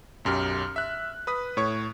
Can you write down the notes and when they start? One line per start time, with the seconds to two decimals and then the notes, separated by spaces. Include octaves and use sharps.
0.25 B1 F#2 G4 F6
0.76 E5 F#6
1.27 B4 D#6 B6
1.57 A2 C#5 C#6